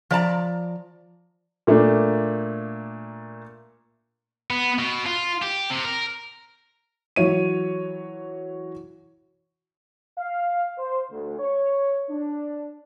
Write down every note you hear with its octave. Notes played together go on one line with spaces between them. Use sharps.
F3 D5 A5 A#5
A#2 A3 A#3 D4
B3
B2
F4
G4
C3
A#4
E3 F#3 C#5 D#7
F5
C5
D2
C#5
D4